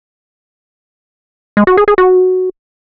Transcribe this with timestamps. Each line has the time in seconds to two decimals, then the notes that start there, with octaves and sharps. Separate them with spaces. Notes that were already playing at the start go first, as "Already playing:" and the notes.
1.57 G#3
1.67 F#4
1.77 G#4
1.88 G#4
1.98 F#4